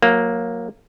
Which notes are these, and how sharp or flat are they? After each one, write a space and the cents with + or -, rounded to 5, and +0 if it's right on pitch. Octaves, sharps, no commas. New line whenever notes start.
F#3 -20 A#3 +0